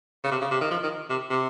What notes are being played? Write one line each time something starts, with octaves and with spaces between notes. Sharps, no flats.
C#3
C3
C#3
C3
D#3
F3
D#3
C3
C3